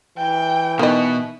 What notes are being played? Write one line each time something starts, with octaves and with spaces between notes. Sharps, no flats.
E3 G5
B2 D#3 D#5